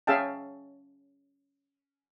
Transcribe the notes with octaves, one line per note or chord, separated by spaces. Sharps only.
C#4 G#4 E5 F5 G5 A5